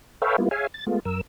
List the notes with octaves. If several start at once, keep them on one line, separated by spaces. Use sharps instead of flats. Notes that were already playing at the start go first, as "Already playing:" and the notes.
A4 B4 C#5 E5 F5 G5
G3 A#3 B3 E4 F4
G#4 C#5 E5 F5 G#5
A6
G#3 A3 B3 F4
F#2 A#4 E6